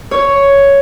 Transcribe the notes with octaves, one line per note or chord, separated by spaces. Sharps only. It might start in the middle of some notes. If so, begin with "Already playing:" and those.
C#5